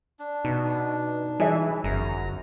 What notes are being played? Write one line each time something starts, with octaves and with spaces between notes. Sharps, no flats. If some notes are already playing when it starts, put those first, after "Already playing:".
D4
B2 D#4
E3 G#4 E5
G1 F#2 A#5